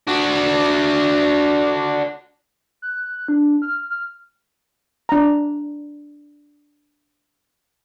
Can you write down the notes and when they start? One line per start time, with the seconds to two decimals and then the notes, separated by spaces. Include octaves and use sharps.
0.07 D4 F#4
2.82 F#6
3.28 D4
3.62 F6
3.90 F6
5.09 D4 A#5